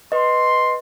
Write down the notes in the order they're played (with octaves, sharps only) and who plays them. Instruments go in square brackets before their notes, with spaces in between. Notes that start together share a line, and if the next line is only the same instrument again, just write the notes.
[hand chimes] B4 D#5 [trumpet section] C6